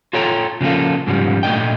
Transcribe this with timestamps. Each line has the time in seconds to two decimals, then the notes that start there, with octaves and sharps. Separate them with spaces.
0.13 F4 A4 C#5 G5 A#5
0.61 C#3 F3 A#3 F4 A4
1.07 G#2 C#3 F3 G3
1.43 A#2 A3 D4 D#5 G5